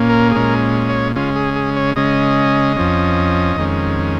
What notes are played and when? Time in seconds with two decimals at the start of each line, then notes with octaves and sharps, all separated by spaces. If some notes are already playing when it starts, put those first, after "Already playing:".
Already playing: A#2 A#3 C#4
0.09 A#4
0.31 G#4
0.36 A#2 G#3 C#4 A#4
0.89 C#5
1.16 C#3 G#3 C#4 F4
1.36 G#4
1.56 G#4
1.77 C#5
1.96 C#3 G#3 C#4 D#5
2.77 F2 F3 C#4
3.57 F2 D#3 G#3 C#4